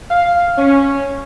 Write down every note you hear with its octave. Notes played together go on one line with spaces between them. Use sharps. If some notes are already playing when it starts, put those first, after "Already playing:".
F5
C#4